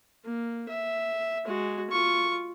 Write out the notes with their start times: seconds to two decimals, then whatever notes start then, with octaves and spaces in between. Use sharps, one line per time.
0.25 A#3
0.69 E5
1.45 G#3 F#4
1.91 F4 C#6